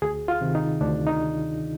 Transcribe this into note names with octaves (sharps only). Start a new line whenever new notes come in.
D2 G#4
F4
C3 D#3
D#4
D2 D4
D#4